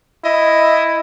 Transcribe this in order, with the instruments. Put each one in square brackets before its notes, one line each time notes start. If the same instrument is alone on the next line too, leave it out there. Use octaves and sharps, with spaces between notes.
[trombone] E4 [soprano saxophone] D#5